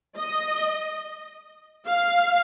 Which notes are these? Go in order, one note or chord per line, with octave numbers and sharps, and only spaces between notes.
D#5
F5